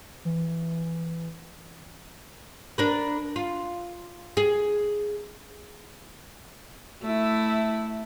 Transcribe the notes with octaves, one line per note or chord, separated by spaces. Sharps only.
E3
D4 A#4 B4
F4
G#4
A3 E4